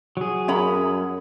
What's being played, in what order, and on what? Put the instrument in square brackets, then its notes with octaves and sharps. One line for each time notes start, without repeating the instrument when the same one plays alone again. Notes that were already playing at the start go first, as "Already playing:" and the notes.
[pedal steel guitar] F#3 G#4
[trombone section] F#2 [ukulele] C#4 A#5 B5